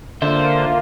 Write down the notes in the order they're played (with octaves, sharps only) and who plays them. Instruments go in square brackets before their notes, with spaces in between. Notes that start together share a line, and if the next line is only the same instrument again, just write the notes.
[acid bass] D3 [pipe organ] A#3 F4 [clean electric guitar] D4 A4 E5 [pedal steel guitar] C5